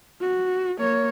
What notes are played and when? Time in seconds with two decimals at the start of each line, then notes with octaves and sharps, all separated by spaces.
0.21 F#4
0.78 A#3 C#5